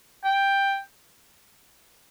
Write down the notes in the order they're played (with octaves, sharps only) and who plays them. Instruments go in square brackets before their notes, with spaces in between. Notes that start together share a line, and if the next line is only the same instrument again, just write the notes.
[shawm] G5